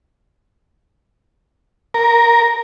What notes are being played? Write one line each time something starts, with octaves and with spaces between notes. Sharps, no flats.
A#4